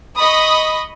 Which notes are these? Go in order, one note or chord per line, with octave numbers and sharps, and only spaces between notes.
D#5 B5 C#6 D#6